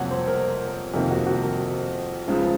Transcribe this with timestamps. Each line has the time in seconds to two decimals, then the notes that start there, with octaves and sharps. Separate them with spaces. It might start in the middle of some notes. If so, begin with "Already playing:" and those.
Already playing: F2 C3 F#3 A#3 C#5 F#5
0.11 C5
0.27 A#4
0.94 F2 C3 D#3 A#3
1.11 F#4
1.27 F#4
1.43 A#4
2.28 C#2 C#3 F3